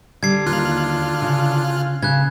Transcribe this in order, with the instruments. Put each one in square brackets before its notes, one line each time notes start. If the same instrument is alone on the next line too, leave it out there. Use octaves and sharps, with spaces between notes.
[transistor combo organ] D3 [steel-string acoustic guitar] G3 [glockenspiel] G#6 C7
[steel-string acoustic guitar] D#2 [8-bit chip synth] F4 F6 F#6
[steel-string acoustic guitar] C#3
[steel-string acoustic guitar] C#3 [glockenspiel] F#6 G#6